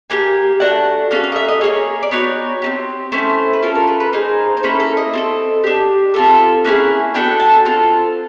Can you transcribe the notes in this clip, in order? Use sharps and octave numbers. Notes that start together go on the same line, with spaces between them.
A#3 D#4 G4 G#5
A3 D4 F#4 F#5
A#3 C#4 F#4 A4 F5
F5
D#5
E5
D#5
A#3 D#4 G#4 C#5
D5
B3 D#4 F#4 C#5
C4 D#4 G4
A3 C#4 E4 C5
B4
C#4 F4 A4 A#4
A#4
B4
B4
A#3 D#4 G#4 C5
C5
A#3 C#4 E4 A4 B4
A4
D#5
C4 F4 A4
D4 G4
C4 F4 A4 E5
A#3 C#4 E4 G#4 F#5
B3 D4 F#4 A4 G5
A5
C4 F4 A4